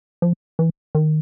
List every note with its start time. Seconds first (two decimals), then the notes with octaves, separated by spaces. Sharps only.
0.22 F3
0.59 E3
0.95 D#3